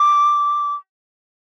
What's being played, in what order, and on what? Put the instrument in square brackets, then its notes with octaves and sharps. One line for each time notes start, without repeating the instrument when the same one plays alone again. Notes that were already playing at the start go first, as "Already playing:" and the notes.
Already playing: [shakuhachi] D6